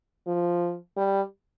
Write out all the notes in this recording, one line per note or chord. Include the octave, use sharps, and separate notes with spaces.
F3
G3